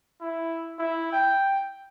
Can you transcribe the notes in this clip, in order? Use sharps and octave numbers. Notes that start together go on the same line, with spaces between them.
E4
E4
G5